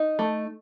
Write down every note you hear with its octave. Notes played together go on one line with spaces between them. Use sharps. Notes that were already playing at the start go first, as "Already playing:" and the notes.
Already playing: D#4
A3